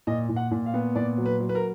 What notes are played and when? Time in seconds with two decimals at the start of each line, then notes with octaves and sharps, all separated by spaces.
0.07 A#2 D#5
0.29 A#2
0.36 F#5
0.51 A#2
0.66 F5
0.74 B3
0.96 A#2 D5
1.18 F#3
1.25 B4
1.40 F#3
1.49 B4
1.55 A#4